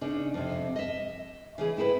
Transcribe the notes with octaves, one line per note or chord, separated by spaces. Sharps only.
C#3 D4 D#4
F2 C3
D#5 E5
C#3 E3 G#4
C4 E4 G#4 A4 B4